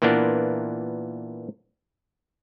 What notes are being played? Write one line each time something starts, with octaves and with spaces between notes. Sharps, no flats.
A#2 E3 A#3 B3 D4